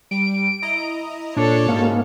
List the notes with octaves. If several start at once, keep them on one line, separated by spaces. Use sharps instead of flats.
G3 D7
E4 D#5 A#5
A#2 D4 A4 C#5
G#2 C#3 A#3 F#4